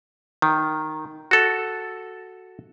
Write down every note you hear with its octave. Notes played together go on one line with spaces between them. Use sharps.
D#3
F#4 A4